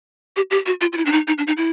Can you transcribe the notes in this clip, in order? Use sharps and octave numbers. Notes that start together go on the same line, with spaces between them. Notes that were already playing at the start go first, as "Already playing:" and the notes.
G4
G4
F#4
F4
F4
E4
D4
D#4
D#4
D4
D#4
E4